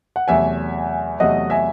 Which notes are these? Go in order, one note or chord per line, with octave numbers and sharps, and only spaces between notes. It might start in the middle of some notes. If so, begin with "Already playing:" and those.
F#5
E2 C3 F#3 A3 E5 G#5
E2 C3 F#3 A3 D#5 F#5
E5 G#5